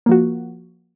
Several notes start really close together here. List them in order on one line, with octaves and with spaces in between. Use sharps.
A#3 F3 F#4